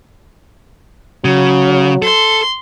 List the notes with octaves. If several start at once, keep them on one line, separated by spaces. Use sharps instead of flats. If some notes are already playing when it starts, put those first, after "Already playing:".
C#3 F#3
A4 C6